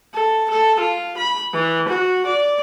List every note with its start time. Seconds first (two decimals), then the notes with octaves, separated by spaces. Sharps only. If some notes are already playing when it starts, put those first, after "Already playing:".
0.14 A4
0.50 A4
0.80 F4
1.17 B5
1.54 E3
1.89 F#4
2.26 D5